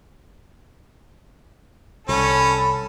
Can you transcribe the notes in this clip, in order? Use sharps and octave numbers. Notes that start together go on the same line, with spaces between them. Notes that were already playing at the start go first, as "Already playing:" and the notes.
C2 C#4 A4 B5